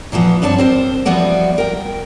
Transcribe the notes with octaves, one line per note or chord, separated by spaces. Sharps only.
A#2 E3 F3 B3
G2 C4 D4 C#5 A5
C4 A#4 C5
E3 F3 G3 B3 F#4 D5
A#4 G5